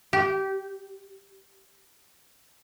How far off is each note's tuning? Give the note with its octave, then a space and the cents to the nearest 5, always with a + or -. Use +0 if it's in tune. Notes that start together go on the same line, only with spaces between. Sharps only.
G4 -20